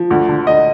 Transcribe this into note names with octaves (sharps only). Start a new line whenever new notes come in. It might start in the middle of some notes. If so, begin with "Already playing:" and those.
Already playing: F3
D2
D3
D2 D#5